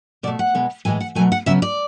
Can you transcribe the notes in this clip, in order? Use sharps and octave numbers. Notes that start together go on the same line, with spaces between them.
B2 A3 D5
F#5
B2 G#3 B3
A2 E3 G#3 G#5
F#5
B2 F#3 A3 G#5
F#5
C#3 F#3 B3 E5
D5